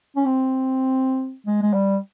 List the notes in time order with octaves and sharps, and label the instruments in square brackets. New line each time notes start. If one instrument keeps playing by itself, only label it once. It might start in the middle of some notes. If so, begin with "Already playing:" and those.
[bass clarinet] C#4
C4
G#3
G#3
G3